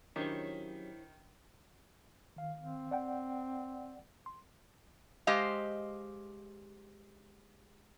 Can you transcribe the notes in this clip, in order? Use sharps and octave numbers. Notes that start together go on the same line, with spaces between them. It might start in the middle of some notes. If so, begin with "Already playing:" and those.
D#3 F#3 C#4 D4 E4 G4 C5 C#5
D#3 F5
C4
D5 F#5 G5
C6
G#3 G4 C5 D#5 F5